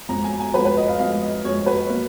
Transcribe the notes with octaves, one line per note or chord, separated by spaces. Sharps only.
F2 F3 G#3 A#5
G#5
G#5
F2 F3 G#3 B4
B4
D#5
F5
F2 F3 G#3 F5
D#5
F2 F3 G#3 C#5
B4
F#3 A#3